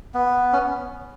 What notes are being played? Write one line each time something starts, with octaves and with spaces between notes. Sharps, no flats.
B3
C#4